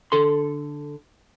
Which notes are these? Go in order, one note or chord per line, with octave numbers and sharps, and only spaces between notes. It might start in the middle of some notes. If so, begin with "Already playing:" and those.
D3 A4 C6